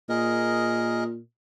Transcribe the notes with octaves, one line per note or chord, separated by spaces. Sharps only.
A#2 G#4 A#4 D#5